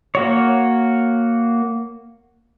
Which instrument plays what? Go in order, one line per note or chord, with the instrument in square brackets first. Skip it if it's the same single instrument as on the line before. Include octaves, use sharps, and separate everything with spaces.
[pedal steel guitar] A#3 F#4 C#5